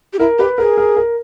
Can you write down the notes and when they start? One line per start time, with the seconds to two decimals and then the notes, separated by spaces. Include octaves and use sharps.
0.13 G4
0.19 E4 A#4
0.38 G4 B4
0.58 G#4 A#4
0.77 A#4
0.96 A#4